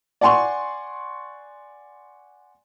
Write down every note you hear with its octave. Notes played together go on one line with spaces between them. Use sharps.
D5 F#5 G#5 C6 C#6